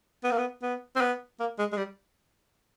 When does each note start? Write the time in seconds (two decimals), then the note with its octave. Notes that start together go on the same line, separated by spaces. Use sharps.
0.24 B3
0.31 A#3
0.38 B3
0.63 B3
0.96 C4
1.01 B3
1.40 A#3
1.59 G#3
1.73 G#3
1.77 G3